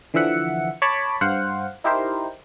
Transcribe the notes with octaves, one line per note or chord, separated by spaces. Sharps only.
D3 E3 F3 E5 F#5 C#7
C#5 A5 B5 D6
G2 C5 F5 F#5
D#4 E4 G4 A#4 C5